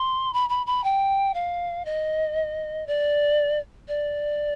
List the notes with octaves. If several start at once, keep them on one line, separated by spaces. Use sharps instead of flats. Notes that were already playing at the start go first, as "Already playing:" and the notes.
Already playing: C6
B5
B5
B5
G5
F5
D#5
D5
D5